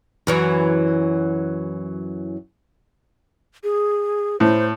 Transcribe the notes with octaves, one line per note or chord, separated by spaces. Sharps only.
F#2 E3 F#3
G#4
A2 C5